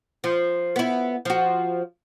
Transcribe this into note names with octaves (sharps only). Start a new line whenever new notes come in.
F3
B3 E4
F3 F#4